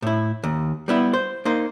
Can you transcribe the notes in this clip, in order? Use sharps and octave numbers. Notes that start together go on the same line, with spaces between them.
A2 E4
D#2
G3 B3 E4
C5
A#3 D#4 C5